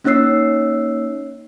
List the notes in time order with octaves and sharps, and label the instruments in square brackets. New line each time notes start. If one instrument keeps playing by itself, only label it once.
[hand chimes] A#3 C#4 D#4 C#5 E6 C7